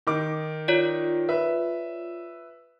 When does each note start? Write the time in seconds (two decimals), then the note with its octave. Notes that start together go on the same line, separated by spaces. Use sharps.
0.07 D#3 D#4 D6
0.68 F4 C#5 D5
1.28 B4 E5